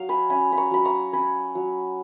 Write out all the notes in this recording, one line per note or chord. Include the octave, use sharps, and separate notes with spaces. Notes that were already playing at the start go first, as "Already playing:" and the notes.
Already playing: F#3 F5
G#5 B5
C#4 G#5 B5
B5
A#5 C#6
F#3 B5
A#5 C#6
C#4 G#5 B5
F#3